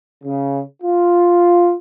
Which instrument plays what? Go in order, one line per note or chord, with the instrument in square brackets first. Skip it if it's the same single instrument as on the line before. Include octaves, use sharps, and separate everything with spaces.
[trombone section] C#3
F4